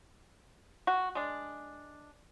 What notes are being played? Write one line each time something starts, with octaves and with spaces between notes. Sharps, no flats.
F#4
G#3 D4